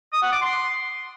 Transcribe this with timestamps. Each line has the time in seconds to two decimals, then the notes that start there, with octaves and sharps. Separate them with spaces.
0.13 D#6
0.22 F#5
0.32 D6
0.42 C6